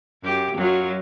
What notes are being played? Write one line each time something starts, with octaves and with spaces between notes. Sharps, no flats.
F#2 G4
F#2 F#3 F4